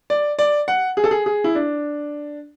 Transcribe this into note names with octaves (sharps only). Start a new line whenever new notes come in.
D5
D5
F#5
G#4
A4
G#4
G#4
E4
D4